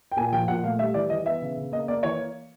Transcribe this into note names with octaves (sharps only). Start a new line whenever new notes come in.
G5
A#2 G#5
F3 G5
A#2 F#5
A3 F5
G3 E5
E3 D5
E3 D#5
B3 E5
C#3
C#3
A#3 D#5
A#3 D5
E3 C#5